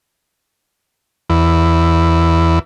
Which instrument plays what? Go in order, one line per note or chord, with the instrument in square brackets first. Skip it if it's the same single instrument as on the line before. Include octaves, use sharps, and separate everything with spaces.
[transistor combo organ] E2